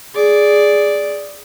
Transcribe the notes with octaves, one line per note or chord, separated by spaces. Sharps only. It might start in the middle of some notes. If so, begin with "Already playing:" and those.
G#4 D5